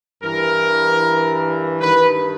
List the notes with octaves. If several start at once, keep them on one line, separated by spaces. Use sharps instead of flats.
G2 E3 A#4
G2 D#3 B4